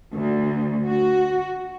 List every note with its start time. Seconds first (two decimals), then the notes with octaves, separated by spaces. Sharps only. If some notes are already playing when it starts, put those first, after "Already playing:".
0.14 D2
0.85 F#4